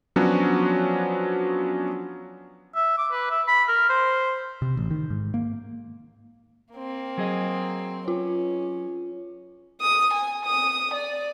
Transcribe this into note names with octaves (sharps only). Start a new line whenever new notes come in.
F3 F#3 B3 C#4 D4 F#4
E5
D6
B4
E5
B5
A#4
C5
C3
A1
D#3
G#2
A#3
A#3 C4
F#3 G#4 D#5
C#4 F4
D#6
G#5
D#6
D5